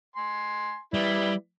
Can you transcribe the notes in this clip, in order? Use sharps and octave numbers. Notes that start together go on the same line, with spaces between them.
G#5 C6
G3 E4 B4 D5